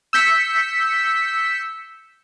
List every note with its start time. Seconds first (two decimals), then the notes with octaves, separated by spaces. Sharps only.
0.13 E6 G6 B6 C#7